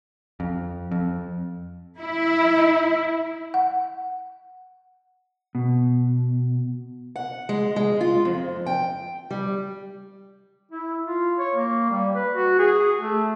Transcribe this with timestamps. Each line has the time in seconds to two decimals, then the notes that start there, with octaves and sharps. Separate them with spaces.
0.40 F2
0.91 F2
1.98 E4
3.54 F#5
5.55 B2
7.16 F#5
7.49 G#3
7.76 G#3
8.01 F4
8.25 F2
8.66 G5
9.31 G3
10.72 E4
11.06 F4
11.39 C#5
11.55 A#3
11.91 G3
12.15 B4
12.35 F#4
12.59 G#4
13.01 A3